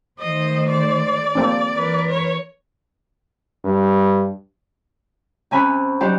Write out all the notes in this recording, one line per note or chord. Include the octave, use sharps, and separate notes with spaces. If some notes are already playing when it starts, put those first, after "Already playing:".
D#3 A3 C5 D#5
D5
A#3 C4 D4
E3 A#4 B4
C#5
G2
C3 C#4 G#5 B5 F#6
F#3 D#4 G4 C5 D5 F#5